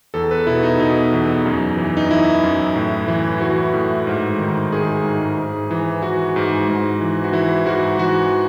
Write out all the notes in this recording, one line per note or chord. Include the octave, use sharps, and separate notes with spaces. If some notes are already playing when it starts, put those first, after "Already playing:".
E2 A4
B4
B2 E4
D#4
B2 D#4
E2
F#2
E3
D#4
E3 E4
F#2
A2
E3
E3 F#4
A2
G#2
D#3
D#3 G#4
G#2
G#2
E3
E3 F#4
G#2
G#2
E3
F#4
E3 E4
G#2 F#4
E3 F#4